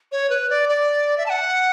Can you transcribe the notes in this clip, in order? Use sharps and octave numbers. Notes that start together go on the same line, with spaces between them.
C#5
B4
D5
D5
E5
A5
F#5